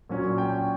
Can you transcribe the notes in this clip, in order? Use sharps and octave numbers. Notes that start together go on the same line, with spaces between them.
A#2 F#3 C#4
G5